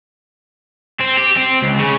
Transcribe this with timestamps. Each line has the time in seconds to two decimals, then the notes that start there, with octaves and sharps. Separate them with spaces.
1.00 C4
1.17 G4
1.37 C4
1.63 C#2
1.80 C#3